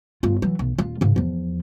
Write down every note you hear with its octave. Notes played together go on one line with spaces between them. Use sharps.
G1 F4
E3 F#3
B1
D#1 F4
G#2 C#3
E2 F3